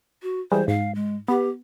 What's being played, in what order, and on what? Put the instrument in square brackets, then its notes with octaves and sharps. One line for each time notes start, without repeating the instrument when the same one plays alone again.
[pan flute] F#4
[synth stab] E3 G3 G#3 [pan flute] C5
[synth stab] G#2 [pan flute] F5
[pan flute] G#3
[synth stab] B3 [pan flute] G4